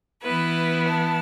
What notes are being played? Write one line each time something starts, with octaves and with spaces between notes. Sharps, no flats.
E3 B3 E4 B4
A5